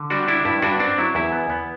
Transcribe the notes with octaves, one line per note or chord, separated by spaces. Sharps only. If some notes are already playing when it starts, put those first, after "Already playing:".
Already playing: D3
G3 D4 F#4
D4 E4
G2 E4
G2 D4 F#4
C4 D4
F#3 E4
E2 E4
B3
B3